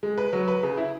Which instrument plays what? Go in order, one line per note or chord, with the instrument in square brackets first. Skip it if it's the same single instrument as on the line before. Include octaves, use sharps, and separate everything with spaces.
[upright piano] G#3
B4
F#3
B4
C#3
E4